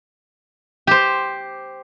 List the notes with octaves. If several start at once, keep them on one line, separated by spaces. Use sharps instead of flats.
G4 C5